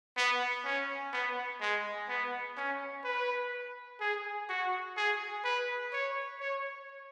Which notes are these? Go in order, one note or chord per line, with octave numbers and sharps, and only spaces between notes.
B3
C#4
B3
G#3
B3
C#4
B4
G#4
F#4
G#4
B4
C#5
C#5